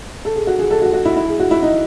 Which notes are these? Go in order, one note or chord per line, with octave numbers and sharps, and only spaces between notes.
A4
G#4
F#4
G#4
A4
F#4
F#4
E4
E4
G#4
F#4
E4
D#4